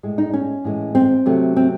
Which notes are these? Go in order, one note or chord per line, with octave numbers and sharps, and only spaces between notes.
A2 G#3
D#4
C#4
A2 E3 G#3
C4
C3 F#3 A3
C4